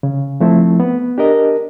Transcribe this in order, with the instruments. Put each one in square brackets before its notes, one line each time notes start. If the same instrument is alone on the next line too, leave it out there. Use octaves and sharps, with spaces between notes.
[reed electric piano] C#3
F3 A3 C4 E4
B3
D4 G4 A#4 D#5